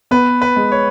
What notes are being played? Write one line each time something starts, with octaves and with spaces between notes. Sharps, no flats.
B3 B4
B4
G#3
C#5